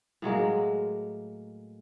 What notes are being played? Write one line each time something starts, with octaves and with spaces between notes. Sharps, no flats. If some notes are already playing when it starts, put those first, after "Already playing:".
A2 F#3 G#3 A#3